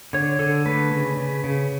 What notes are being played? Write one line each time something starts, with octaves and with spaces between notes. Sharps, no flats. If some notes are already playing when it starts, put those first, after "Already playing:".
D3 C#5
D3 A4
A3 B4
C#3
C#3
C#3